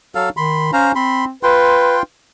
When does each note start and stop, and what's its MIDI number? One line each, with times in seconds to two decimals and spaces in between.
0.15 0.29 54
0.15 0.29 69
0.15 0.29 77
0.37 0.71 51
0.37 0.71 83
0.37 0.71 84
0.73 0.94 61
0.73 0.92 72
0.73 0.92 77
0.73 0.92 82
0.95 1.31 60
0.95 1.25 83
0.95 1.25 84
1.43 2.02 65
1.43 1.97 71
1.43 2.02 79
1.43 2.02 84